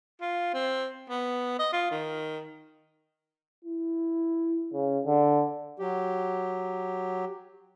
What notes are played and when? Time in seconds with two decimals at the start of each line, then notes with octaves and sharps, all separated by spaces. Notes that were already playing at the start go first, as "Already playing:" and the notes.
0.21 F4
0.54 C4
1.10 B3
1.59 D#5
1.73 F4
1.91 D#3
3.65 E4
4.73 C#3
5.06 D3
5.79 F#3 G4